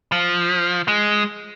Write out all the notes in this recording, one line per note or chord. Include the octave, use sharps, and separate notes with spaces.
F3
G#3